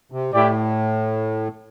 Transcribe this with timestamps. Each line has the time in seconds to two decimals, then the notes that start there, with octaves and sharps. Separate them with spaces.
0.12 C3
0.33 A2 A3 E4 G4 D5